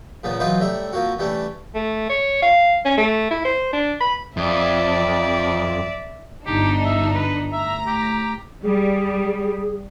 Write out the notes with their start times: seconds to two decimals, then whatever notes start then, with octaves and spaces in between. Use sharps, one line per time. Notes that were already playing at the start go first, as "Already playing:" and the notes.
0.24 A#2 C#3 F3 B3
0.40 E3 F#3 D#4 F4 B4 C5
0.60 A2 G3 E5 A#5
0.93 F3 A#3 C4 F#4
1.19 E3 G3 A3 C#4 D4
1.75 A3
2.09 C#5
2.42 F5
2.85 C#4
2.97 A3
3.30 E4
3.45 C5
3.73 D4
4.01 B5
4.37 F2 D5 E5
6.46 G1 D4 D#4 G4
6.85 E5
7.15 B4
7.53 A2 E5 A#5
7.87 G4
8.63 G3 G#4